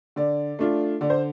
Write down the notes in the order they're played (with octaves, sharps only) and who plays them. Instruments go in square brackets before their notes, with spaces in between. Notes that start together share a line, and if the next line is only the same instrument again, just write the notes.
[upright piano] D3 D5
A3 D4 F4
D3 D5
C5